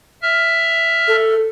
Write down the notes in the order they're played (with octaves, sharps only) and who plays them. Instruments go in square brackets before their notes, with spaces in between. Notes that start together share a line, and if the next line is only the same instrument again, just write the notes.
[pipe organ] E5 F6
[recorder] A4